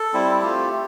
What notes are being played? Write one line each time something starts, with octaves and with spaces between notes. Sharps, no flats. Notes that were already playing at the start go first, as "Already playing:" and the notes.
Already playing: A4
G3 C4 E4
A3 C4 F4 G4
A3